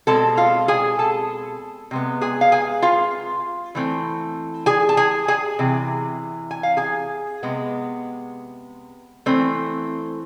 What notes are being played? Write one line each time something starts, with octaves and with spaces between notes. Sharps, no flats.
B2 G#3 C4 A4 A5
F4 F5
G#4 G#5
A4 A5
C3 G#3 B3
G#4 G#5
F5
G#4 G#5
F4 F5
E3 A3 C4
G#4 G#5
A5
G#4 G#5
G#4 G#5
C3 E3
G#5
F5
G#4 G#5
C3 G#3 B3
E3 A3 C4